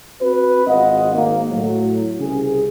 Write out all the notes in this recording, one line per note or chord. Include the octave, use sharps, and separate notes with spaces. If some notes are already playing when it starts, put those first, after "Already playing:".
C4 F#4 B4
G#1 C4 F4 D#5 F#5
G#1 A#3
A2 F#3
C2 C#3 G#4